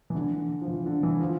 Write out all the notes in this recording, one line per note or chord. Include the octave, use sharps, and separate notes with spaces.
E3
D3
F3
E3
D3
E3
F3